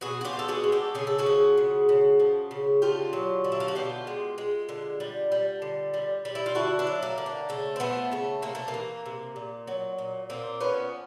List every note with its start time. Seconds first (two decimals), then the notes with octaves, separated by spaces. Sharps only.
0.01 B2 F#4 G#4
0.21 F#4
0.25 F4 G4
0.33 G#3
0.39 A4
0.48 F#4 G#4
0.64 G#3
0.72 G4 A4
0.95 C#3 G#4
1.07 A4
1.19 F#4 G#4
1.26 F3
1.57 C#3
1.89 C#3
2.20 F3
2.51 C#3
2.82 D3 F4 G4
3.13 F#3
3.44 D3
3.52 E4
3.60 F4
3.68 F#4
3.75 B2 F4 G4
4.07 G#3
4.38 G#3
4.69 D3
5.00 G3
5.32 G3
5.62 D3
5.94 G3
6.25 G3
6.35 E4
6.46 F4
6.55 D3 E4 F#4
6.79 D4 E4
6.87 F#3
7.03 A#3
7.18 D3
7.26 A#3
7.49 C#3 A3
7.76 C4
7.80 F3 A3 B3
8.12 C#3 A3
8.42 C3 A#3
8.55 A3
8.68 A#3
8.74 E3
9.06 C3
9.36 A#2
9.67 F#3
9.98 A#2
10.30 A#2 A#3 C4
10.61 F3 B3 C#4